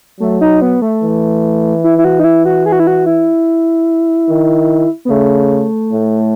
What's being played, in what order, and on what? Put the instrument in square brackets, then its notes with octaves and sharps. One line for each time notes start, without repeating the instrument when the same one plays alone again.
[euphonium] F#3 [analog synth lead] A3
[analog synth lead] D#4
B3
A3
[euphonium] E3
[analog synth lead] E4
E4
F#4
D#4
E4
F#4
G#4
F#4
E4
F#4
E4
[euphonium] D#3
[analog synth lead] B3
[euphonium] C#3 [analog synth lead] A3
[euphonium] A2